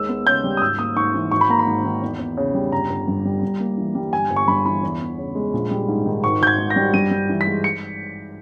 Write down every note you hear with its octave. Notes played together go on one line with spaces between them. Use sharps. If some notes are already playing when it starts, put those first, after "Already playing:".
Already playing: D#2 G#3 E6
B3
C#3 G6
G3
D#6
G#1 E6
A#3 D#6
G#2 C#6
E3
G#1 C#6
B5
A#3 A#5
B5
G#2
D#3
E2
E2
C#3
G3
G1 A#5
G1
G2
G3
G2
A#3
E3
G3
G1 G#5
G1
C#6
G2 B5
E3 B5
E2
E2
C#3
G#3
A#1
G3
G#2
D#3
G#1 C#6
G#1 G6
G#6
G#2
A#6
G3
G2 D#7
G2
E3
B6
G#3
C#7